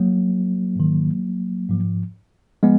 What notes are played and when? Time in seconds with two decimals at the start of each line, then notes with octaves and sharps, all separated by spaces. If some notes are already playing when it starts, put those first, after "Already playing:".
Already playing: F#3 A#3
0.76 G#2 D#3
1.69 G#2 F3
2.63 F3 G#3 B3